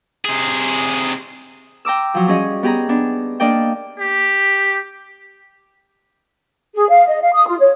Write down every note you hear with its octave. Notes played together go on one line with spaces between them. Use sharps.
C3 G#4
G5 A#5 D6 E6
F3 F#3
G3 C#4 G#4 D#5
B3 G4 G#4 A#5
B3 D4
A#3 D4 D5 D#5 G5
G4
G#4
F5
D#5
F5
D#6
F4
C#5